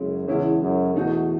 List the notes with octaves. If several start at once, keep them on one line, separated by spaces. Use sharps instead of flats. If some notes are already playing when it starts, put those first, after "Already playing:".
Already playing: F#2 C#3 G#3 C#4 E4
E2 C#3 G#3 C#4 E4
F#2
E2 B2 A3 D#4 F#4